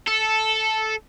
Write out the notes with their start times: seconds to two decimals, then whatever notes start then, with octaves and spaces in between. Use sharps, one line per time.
0.08 A4